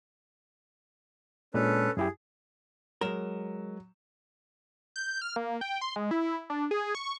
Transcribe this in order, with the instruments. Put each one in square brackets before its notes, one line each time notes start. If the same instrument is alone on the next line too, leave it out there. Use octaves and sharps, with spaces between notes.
[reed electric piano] A#2 G#3 D4 [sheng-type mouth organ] C#4 A4 B4
[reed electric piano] F#2 E4 G4 [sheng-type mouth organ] G#4
[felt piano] F#3 E7 [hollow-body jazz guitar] G#3 A#4
[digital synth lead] G6
F6
A#3
G5
C6
G#3
E4
D4
G#4
C#6